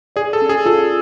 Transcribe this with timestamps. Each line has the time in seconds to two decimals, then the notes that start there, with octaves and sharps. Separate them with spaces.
0.16 G#4 D5
0.33 A4
0.42 C#4
0.49 G#4
0.66 F4 A4